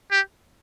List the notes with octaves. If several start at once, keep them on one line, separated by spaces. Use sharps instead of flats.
G4